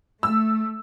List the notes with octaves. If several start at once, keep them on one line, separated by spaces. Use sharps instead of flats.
A3 E6